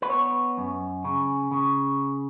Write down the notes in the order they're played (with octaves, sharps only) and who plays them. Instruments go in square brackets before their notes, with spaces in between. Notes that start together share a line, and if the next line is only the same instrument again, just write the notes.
[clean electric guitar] B4
B3 C#5
F#2
C#3
C#3